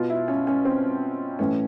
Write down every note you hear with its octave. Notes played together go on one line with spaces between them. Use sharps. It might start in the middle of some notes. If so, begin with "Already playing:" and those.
Already playing: B2 F4
E4
C#4
C#4
C4
A2 E3 C#4